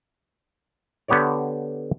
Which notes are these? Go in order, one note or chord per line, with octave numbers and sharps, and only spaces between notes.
D3 B3 G4 C#5 D5